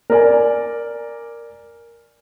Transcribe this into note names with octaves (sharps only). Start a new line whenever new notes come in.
A#4 D5 G#5